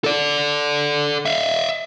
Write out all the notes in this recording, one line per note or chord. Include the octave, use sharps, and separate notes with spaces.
A4 D5
E5 F5